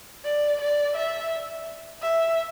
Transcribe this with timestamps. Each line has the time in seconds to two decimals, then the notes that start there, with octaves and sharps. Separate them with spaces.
0.25 D5
0.61 D5
0.96 E5
2.02 E5